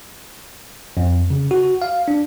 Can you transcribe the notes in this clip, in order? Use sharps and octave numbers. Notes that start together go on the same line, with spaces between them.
F2
C#3
F#4
F5
D4